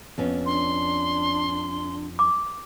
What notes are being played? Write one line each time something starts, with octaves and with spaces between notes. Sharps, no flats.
F2 B3 C#4
D4 C6
D6